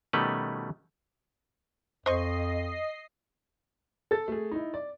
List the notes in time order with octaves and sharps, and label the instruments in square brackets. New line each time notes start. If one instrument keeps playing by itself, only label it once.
[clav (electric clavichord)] B2 D#3 G3 A3 C#4 B4
[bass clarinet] F2 [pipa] C5 C#6 [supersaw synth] D#5 C7
[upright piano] A4 A6
A3 G#4
D#4 E4
D5